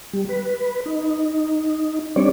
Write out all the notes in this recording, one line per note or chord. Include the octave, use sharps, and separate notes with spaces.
G3
B4
D#4
G3 C4 D4 C#5 D5